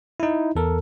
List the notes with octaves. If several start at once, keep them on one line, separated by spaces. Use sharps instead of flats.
D#4 E4
E2 A4 A#4